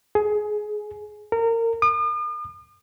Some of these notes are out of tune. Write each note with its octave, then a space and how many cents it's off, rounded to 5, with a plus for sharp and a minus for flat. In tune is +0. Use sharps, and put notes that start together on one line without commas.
G#4 +20
A#4 -25
D#6 -45